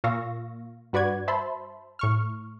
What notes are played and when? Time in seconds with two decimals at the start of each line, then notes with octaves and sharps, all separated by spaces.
0.04 A#2 F4 F5 C#6 E6 A#6
0.93 G2 F#4 B4 D5 F#5 G#6
1.28 C5 E5 A5 B5 C6
1.99 A2 C#6 F6